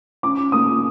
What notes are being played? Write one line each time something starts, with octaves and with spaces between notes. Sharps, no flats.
C#4 D6
A#3 D#6